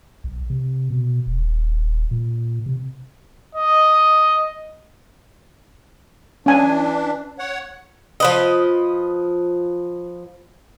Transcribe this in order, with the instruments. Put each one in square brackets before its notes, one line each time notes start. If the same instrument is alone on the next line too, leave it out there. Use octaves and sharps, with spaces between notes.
[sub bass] B1
C3
B2
D#1
A#2
C3
[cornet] D#5
[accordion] E3 D4 [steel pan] C#4 G#5
[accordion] C#5 F#5
[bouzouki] F3 B4 D#5